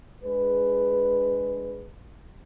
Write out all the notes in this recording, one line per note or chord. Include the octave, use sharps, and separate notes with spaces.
G#3 D4 G#4 B4